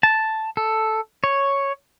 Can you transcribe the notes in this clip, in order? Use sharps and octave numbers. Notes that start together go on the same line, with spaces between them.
A5
A4
C#5